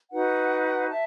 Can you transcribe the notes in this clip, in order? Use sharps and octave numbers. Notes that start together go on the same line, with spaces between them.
D#4 F#4 B4 F#5
E5 A5